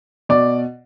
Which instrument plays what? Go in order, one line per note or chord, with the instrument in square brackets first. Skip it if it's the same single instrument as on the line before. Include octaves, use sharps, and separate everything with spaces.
[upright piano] B2 D5